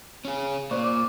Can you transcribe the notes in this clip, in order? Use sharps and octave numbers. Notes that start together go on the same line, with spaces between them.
C#4 G#4
A#2 C5 D5 C#6
D6